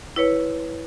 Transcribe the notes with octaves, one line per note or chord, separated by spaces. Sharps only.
E4 B4 C#5